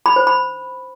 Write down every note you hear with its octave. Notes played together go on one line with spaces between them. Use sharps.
B5
C5
B5